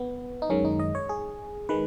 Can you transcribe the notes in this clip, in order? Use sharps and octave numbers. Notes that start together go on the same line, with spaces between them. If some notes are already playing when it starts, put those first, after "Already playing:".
Already playing: B3
D#4
F#2 D#3 G#3 C#4
D#4
D#5
C#5
G#4
D#3 G#3 B4